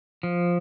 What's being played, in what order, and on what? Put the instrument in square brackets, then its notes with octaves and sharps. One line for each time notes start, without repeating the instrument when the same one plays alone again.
[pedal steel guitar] F3